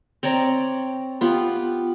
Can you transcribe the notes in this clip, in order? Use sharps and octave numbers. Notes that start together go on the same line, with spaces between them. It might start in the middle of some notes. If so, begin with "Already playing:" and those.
C4 C#5 D5 A#5
B3 F4 G4